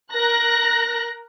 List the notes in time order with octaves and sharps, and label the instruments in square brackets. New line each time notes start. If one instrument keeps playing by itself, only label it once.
[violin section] A#4 F#6 A#6